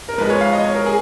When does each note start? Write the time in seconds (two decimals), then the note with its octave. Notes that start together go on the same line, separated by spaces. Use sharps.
0.09 A#4
0.18 G#2 F3 G#3 B4
0.30 C#5
0.41 F5
0.53 D#5
0.64 C#5
0.75 A#4
0.86 G#4